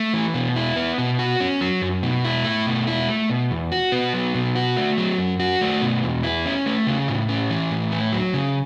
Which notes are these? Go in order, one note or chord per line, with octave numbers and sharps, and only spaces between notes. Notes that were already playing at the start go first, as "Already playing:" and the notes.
Already playing: A3
E3
B2
E4
B3
B2
F#4
C#4
F#3
F#2
B2
E4
A3
B2
E4
A3
B2
E2
F#4
B3
F#3
B2
F#4
A3
F#3
F#2
F#4
A3
B2
E2
E4
C#4
A3
C#3
A2
C#4
E3
A2
A3
F#3
C#3